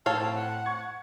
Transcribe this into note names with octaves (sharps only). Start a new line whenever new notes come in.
A2 A4 C#5 F5 A5
C4
F#5
C#6 G#6